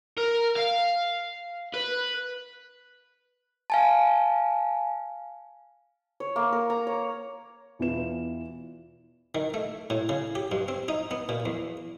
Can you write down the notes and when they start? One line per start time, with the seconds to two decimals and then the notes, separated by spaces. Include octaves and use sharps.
0.18 A#4
0.56 F5
1.74 B4
3.70 F5 G#5 A5
6.20 C#5
6.36 A#3
6.52 A#4
6.70 A#5
6.87 C#5
7.79 E2 B2 E3 F4 B4 E7
9.35 D#3
9.54 A3
9.90 A2
10.09 C#3
10.35 G4
10.52 G2
10.68 C4
10.88 D#4
11.11 B3
11.29 A#2
11.46 E2